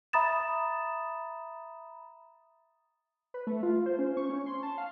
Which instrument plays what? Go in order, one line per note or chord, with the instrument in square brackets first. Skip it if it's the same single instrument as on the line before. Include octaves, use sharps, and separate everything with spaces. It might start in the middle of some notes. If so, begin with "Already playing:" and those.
[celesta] E5 A#5 B5 D#6 A6 E7
[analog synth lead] B4
A3
F4
C5
C#4
C#6
C#4
C6
A5
F5